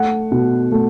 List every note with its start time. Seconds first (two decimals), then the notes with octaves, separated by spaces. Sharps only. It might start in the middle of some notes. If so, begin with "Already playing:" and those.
Already playing: A3 F#5
0.32 B2
0.72 A3